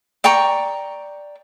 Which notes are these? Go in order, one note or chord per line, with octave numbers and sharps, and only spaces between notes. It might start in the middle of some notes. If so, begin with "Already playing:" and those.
D5 G5 A#5 C#6